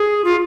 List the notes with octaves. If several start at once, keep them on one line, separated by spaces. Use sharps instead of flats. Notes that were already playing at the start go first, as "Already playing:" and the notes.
Already playing: G#4
F4